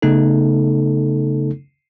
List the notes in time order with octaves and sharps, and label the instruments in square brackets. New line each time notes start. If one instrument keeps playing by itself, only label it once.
[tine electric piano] C#3 A3 B3 D#4 A4